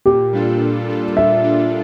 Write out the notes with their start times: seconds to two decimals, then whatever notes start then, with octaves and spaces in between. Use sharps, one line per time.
0.06 A#2 G4
0.33 G3 D4 F4 A4
0.61 A#2
0.89 G3 D4 F4 A4
1.16 A#2 E5
1.43 G3 D4 F4 A4